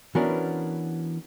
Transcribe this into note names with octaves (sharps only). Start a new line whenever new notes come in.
E3 B3 C#4 D4 F#4 A#4